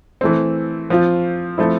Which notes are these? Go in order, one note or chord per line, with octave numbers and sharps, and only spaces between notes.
E3 A3 C4
F3 C4 F4
F3 A3 C4 E4